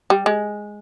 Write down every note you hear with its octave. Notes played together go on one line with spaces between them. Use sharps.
G3
G#3